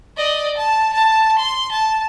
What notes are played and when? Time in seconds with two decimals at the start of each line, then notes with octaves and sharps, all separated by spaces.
0.17 D5 D#5
0.57 A5
0.93 A5
1.39 C6
1.71 A5